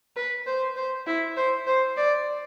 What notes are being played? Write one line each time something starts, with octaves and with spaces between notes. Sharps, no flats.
B4
C5
C5
E4
C5
C5
D5